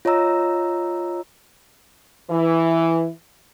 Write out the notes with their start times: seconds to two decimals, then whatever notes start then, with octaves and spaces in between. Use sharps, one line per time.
0.05 F4 C#5 D#5 A#5 E6
2.30 E3